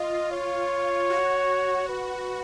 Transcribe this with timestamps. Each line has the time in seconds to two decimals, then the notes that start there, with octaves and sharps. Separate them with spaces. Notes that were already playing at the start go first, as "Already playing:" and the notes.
Already playing: F4 D#5
0.31 C#5
1.10 F#4
1.89 B4